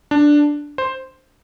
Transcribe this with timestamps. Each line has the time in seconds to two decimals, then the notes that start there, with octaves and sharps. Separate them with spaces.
0.11 D4
0.78 C5